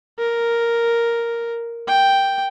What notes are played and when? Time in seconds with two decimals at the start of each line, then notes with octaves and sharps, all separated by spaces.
0.19 A#4
1.88 G5